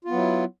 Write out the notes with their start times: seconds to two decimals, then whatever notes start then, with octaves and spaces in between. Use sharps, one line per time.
0.05 F4
0.08 B3
0.12 F#3
0.16 E4